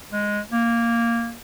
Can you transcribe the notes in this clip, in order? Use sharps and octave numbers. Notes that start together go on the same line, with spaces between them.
G#3
A#3